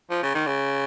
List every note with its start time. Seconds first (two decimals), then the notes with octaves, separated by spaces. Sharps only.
0.10 F3
0.23 C#3
0.35 D#3
0.47 C#3